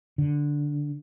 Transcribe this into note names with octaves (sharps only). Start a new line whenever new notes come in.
D3